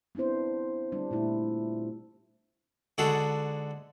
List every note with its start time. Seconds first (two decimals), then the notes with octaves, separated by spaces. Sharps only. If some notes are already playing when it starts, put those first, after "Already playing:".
0.15 B3 C4 D4 E4 C5
0.92 G3 D4
1.11 A#2 A3 E4
2.98 G#2 D3 F#4 G#4 A4 A5